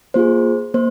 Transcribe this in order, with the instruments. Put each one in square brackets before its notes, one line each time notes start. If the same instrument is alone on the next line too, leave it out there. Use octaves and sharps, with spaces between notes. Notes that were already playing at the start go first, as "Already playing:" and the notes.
[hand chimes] A#3 F4 G#4 C5
A#3 C5